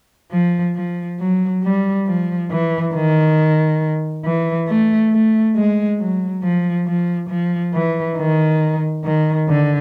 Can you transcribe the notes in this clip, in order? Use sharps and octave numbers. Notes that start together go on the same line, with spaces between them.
F3
F3
F#3
G3
F3
E3
D#3
E3
A3
A3
G#3
F#3
F3
F3
F3
E3
D#3
D#3
D3